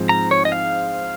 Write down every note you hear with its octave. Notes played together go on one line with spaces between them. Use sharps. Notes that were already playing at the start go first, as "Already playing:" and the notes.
Already playing: G#2 F3 G#3 C4
A#5
C#5
D#5
F5